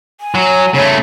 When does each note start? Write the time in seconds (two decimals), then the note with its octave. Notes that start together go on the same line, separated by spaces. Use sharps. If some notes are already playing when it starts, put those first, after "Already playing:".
0.21 G#5
0.35 F#3
0.74 C#3 A3 C#5